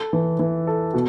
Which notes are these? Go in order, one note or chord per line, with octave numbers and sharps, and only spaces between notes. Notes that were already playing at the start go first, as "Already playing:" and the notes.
Already playing: A4
E3
E3
A4
B2